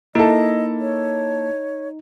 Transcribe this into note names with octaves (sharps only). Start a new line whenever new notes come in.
A#3 D#4 E4 A4 D#5
C#5